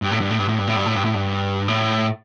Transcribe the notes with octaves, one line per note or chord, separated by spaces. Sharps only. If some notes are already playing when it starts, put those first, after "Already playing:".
G2
A2
G2
A2
G2
A2
G2
A2
G2
A2
G2
A2
G2
A2